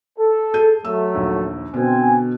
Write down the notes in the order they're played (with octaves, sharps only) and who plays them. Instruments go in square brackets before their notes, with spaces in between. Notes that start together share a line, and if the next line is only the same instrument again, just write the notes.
[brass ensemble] A4
[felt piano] G#4 G6 D#7
[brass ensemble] F#3 A3 [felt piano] E6
[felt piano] A#1 D#2
[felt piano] B2 D3 B3 [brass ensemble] C4 G#5